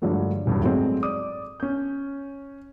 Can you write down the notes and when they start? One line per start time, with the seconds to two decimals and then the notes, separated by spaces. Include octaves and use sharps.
0.02 G2 D3 F3 F#3 G#3 A3
0.46 D1 G#1 G2 F#3
0.63 A2 F#3 G#3 C4 G#4
1.03 D5 D6 D#6
1.60 C#4 G6